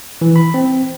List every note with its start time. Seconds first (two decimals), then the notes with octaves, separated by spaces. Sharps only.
0.21 E3
0.36 B5
0.54 C4